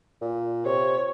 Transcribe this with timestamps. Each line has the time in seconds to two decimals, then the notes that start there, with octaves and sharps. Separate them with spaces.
0.21 A#2
0.65 C3 C#5